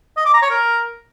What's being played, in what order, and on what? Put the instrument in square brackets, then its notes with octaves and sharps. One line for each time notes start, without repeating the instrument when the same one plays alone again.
[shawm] D#5
D6
A#5
C#5
A#4